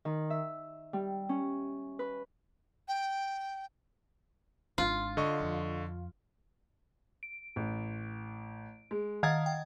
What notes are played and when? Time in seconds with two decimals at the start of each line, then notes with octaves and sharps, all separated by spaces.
0.05 D#3
0.30 E5
0.93 G3
1.29 C#4
1.99 B4
2.88 G5
4.78 G#1 D4 F4
5.17 D3 D#5 C#6
5.40 F2
7.23 D7
7.56 A1
8.91 G#3
9.23 D#3 D#5 F5 F#5 G#6 A6
9.46 G5